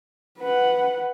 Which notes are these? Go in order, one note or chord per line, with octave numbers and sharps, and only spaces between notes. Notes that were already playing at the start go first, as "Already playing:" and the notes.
B4 F#5